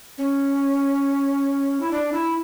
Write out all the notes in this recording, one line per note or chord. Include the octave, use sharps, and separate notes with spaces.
C#4
E4
D4
E4